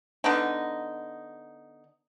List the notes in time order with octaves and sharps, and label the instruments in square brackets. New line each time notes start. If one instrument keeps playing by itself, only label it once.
[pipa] D3 B3 D#4